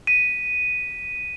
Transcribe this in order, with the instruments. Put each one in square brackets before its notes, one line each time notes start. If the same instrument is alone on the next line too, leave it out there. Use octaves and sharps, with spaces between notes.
[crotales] B6 D#7